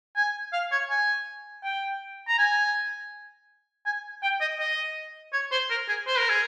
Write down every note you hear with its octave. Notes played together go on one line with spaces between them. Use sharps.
G#5
F5
C#5
G#5
G5
A#5
G#5
G#5
G5
D#5
D#5
C#5
C5
A#4
G#4
C5
A#4
G#4